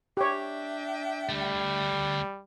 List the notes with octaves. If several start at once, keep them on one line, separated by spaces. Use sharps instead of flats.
D4 G4 C#5 E5 G5
D2 G3 A3